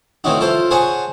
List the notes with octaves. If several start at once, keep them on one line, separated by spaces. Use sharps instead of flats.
E3 A3 C4 C#4 D#4 F#4
E4 F4 A4 C5
G#4 C5 C#5 F#5 G#5 A5